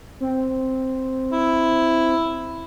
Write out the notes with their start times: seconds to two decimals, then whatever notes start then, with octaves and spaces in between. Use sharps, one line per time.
0.20 C4
1.32 E4